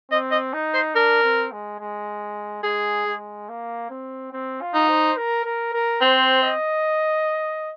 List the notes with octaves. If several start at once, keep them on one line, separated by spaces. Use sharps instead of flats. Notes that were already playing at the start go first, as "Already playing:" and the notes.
C4 D#5
D#5
D#4
C5
D4 A#4
C4
G#3
G#3
G#3 G#4
G#3
A#3
C4
C4
F4
D#4
C5
A#4
A#4
A#4
C4 C5
D#5